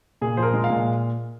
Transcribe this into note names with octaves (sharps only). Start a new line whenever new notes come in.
A#2 G#4
F3 C5
A#4
G#3
F5
A#2